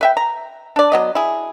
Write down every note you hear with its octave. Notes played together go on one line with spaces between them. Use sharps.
B4 E5 G5
A#5
D4 D5
F#3 B3 D#5
E4 G#4